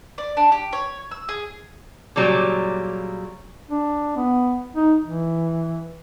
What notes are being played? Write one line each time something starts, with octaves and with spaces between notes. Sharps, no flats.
D5
D4
G4
C#5
E6
G#4
A#2 C#3 F#3 G3
D4
B3
D#4
E3